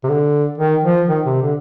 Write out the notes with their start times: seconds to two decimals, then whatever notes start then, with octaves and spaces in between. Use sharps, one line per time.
0.04 C3
0.09 D3
0.58 D#3
0.84 F3
1.09 D#3
1.26 C3
1.42 D3